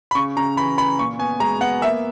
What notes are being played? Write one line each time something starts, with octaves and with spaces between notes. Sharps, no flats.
B5
C#3 C#6
C#3 A#5
E3 B5
E3 B5
A#2 C#6
B3 G#5
G#3 A#5
B3 F#5
A#3 E5